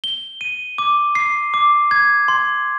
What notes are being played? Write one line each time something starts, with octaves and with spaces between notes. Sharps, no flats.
G7
D#7
D6
C7
D6
G#6
C6